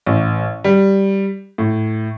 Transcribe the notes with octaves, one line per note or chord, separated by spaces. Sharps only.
A1
G3
A2